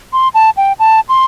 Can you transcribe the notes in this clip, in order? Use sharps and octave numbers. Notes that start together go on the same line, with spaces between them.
C6
A5
G5
A5
C6